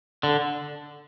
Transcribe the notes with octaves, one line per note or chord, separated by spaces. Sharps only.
D3